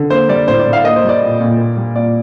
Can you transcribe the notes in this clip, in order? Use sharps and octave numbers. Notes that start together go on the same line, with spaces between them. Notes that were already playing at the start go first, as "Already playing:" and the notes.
Already playing: D3
A#3 C5
G3 D5
A2 C5
D5
A2
F5
A#3 D#5
C5
G3
D5
A#2
A#2
A#3
G3
A#2 D5